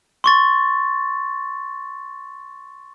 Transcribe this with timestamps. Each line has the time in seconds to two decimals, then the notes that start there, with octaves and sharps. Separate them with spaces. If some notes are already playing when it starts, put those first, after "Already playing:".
0.24 C6 C#6 A6